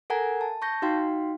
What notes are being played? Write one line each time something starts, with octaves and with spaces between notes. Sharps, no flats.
A4 A#4 F#5 G#5 A#5 G#6
A5
A5 C#6 G6 A#6
D#4 F#4 F5 G5 C6